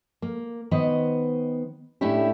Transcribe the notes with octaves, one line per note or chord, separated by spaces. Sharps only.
A#3
D#3 B3 C5 D#5
A2 A3 C#4 D4 E4 G4